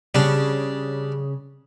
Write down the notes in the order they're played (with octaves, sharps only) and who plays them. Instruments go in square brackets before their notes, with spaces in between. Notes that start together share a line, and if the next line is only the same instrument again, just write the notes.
[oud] C#3 [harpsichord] G3 D4